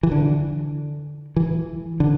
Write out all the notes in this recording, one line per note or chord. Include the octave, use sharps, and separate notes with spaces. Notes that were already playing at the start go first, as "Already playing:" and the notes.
E3
D3
E3
D3